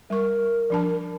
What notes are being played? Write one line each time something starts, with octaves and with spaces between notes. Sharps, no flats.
G3 A#4 C#6
F3 D4 A5